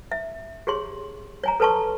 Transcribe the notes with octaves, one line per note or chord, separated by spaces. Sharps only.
E5
G4 G#4 C#5 C6
C#5 G#5 A#5
A4 B4 C#5 A5 C6 C#6